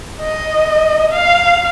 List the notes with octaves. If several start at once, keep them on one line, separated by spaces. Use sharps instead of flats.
D#5
F5